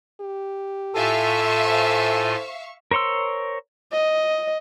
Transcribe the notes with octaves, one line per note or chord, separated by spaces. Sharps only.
G4
A2 F4 A4 E5 F5 G#5 C#6
C5
A#4 C5 C#5 C6 E6
D#5